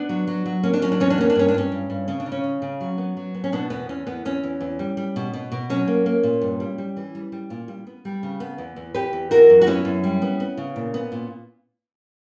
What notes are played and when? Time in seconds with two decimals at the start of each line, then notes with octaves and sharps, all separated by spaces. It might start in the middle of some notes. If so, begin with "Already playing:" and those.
Already playing: B3 D4
0.09 F#3
0.27 F#3
0.46 F#3
0.63 A#3 C#4
0.73 D4
0.82 F#3 C#4
0.92 D4
1.00 E2 C#4
1.10 D4
1.18 A#3 C#4
1.30 D4
1.35 G2 C#4
1.48 D4
1.54 G2 C#4
1.72 G2
1.90 G2
2.08 C#3 C#4
2.20 D4
2.26 C#3
2.32 C#4
2.44 C#3
2.62 C#3
2.81 F#3
2.98 B3
3.17 F#3
3.34 B3
3.44 C#4
3.52 B2 B3 D4
3.70 E2 B3
3.89 E2 C#4
4.07 E2 B3
4.25 E2 C#4
4.43 E2
4.61 E2
4.79 G3
4.97 G3
5.16 B2
5.33 B2
5.52 B2
5.70 F#3 C#4
5.88 A#3
6.06 A#3
6.23 A#2
6.41 G2
6.60 G3
6.78 G3
6.97 E3
7.15 G3
7.32 G3
7.50 A#2
7.68 G3
7.87 B3
8.05 G3
8.23 C#3
8.40 B3
8.58 E2
8.76 E2
8.94 E2 G4 B4
9.13 E2
9.31 E3 F#4 A#4
9.50 F#2
9.62 F#4
9.67 B3 C#4 E4
9.85 F#2
10.04 G3
10.22 B3
10.40 B3
10.57 C#3
10.76 A#2
10.94 B3
11.12 A#2